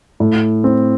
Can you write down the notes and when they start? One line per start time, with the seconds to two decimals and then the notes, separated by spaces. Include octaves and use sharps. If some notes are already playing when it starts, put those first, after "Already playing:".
0.20 A2
0.64 C4